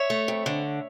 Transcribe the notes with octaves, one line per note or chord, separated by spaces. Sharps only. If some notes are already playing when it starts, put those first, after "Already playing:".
Already playing: C#5 E5
A3
F2
D3